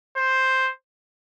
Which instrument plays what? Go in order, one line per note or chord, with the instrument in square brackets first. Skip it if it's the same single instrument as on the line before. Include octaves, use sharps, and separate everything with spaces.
[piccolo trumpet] C5